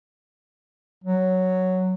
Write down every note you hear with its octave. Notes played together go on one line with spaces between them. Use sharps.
F#3